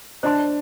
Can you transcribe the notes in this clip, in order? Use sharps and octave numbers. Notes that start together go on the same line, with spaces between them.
D4 C5 D#5 A5 C6